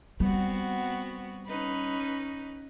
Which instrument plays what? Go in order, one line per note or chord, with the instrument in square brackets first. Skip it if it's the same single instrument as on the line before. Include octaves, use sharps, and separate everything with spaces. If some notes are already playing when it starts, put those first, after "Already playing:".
[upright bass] G3 [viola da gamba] B3 C4 F#4
[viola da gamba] C#4 D#4 B4